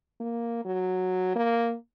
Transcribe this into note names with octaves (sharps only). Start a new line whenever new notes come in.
A#3
F#3
A#3